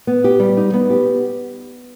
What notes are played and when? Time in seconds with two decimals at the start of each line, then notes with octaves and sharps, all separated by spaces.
0.07 B3
0.24 G4
0.40 G3
0.57 D#4
0.73 B3
0.90 G4